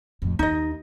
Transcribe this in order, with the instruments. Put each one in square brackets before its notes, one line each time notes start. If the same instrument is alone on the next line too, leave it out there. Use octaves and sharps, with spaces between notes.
[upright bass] F2 A2
[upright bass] D#2 [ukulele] D#4 D#5